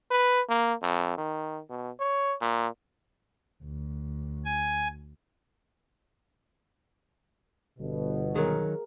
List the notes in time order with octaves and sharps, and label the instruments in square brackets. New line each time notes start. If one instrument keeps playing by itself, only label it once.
[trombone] B4
A#3
F2
D#3
B2
C#5
A#2
[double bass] D2
[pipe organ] G#5
[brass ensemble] G1 B2
[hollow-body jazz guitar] D#3 F#3 [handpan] G#4 A#4